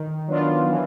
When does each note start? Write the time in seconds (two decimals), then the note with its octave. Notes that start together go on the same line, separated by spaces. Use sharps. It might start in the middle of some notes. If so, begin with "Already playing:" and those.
Already playing: D#3
0.28 F#3 B3 D4 F4
0.69 E3